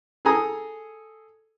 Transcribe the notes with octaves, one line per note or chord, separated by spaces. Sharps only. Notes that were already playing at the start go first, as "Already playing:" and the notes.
G#4 A4 G#5 A#5 D#6